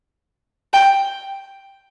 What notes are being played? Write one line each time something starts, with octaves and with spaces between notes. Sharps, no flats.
G5